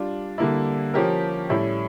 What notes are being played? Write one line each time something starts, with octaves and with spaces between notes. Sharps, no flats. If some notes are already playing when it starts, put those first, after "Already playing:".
Already playing: G3 D4 F4
D3 G3 A#3 E4
F3 C#4 G4 A#4
A2 G3 C#4 E4